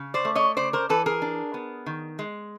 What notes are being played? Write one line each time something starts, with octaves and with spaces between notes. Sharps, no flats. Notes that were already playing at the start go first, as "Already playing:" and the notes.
Already playing: C#3
C5 D5
A3
C#5 D#5
C#3 C5 D5
A#4 C5
E3 A4 B4
G#4 A#4
D4
B3
D#3
G#3